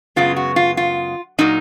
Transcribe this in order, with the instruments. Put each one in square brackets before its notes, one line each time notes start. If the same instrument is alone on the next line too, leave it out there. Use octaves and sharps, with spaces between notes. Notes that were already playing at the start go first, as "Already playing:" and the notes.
[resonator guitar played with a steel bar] F#2 C#3 G#3 B3 F4
F#4
F4
F4
A#2 F#3 A#3 D#4